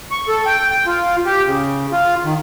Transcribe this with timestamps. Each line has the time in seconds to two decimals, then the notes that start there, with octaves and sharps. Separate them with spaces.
0.11 C#6
0.28 A4
0.46 G5
0.70 G5
0.86 F4
1.26 G4
1.46 C#3
1.92 F4
2.25 D#3